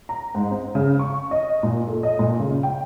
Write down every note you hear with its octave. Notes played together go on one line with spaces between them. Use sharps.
A#5
G#2
C4
C#3
C#6
D#5
A#2
A4
D#5
A#2
C#3
G5